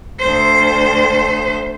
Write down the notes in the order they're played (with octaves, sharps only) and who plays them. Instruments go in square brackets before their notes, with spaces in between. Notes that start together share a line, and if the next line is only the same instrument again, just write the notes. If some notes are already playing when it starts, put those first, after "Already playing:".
[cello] D2 C5